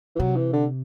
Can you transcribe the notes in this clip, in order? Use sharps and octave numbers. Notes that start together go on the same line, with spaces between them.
E3
C3 F#3
E3
D3